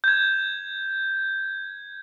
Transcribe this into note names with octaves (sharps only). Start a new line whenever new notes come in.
G6 G#6